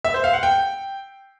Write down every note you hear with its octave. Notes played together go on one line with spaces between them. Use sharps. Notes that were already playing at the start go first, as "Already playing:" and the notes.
E5
C5
F5
F#5
G5